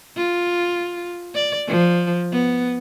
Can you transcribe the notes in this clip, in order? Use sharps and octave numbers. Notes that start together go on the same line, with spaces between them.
F4
D5
F3
B3